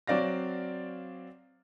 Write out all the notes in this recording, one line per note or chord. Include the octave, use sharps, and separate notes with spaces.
F#3 C4 D5 F5 A#6